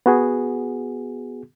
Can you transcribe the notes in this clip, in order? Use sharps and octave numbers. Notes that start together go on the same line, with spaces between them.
B3 F#4 G#4